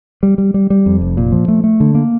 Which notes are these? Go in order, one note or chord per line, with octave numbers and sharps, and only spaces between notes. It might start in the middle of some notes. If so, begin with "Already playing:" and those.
G3
G3
G3
G3
F2
F1
A#2
F3
A3
A3
D3
A#3